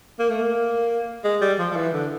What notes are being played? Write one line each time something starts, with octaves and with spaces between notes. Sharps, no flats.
A#3
A3
A#3
G#3
G3
F3
F3
E3
D3